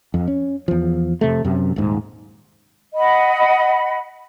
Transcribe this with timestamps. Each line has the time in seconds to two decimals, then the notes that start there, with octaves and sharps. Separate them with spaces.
0.14 F2
0.28 C#4
0.68 E2 F3
1.21 F2 C3 A3
1.45 F#2 C3
1.76 D#1 G#2
2.95 D#5 F#5 B5